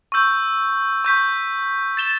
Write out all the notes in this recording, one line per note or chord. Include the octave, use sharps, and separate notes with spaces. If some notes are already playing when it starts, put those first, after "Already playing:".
C#6 E6 G6
C#6 G6 B6
A6 E7 G7